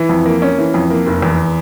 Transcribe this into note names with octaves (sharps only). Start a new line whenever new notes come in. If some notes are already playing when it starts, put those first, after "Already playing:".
Already playing: E3
F2
A#3
C#4
E3
F2
A#3
F1
E2